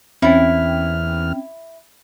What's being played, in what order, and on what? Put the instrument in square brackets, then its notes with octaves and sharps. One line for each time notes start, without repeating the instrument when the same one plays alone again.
[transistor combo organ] E2 F6 [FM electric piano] C4 C#4 G5 [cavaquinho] E4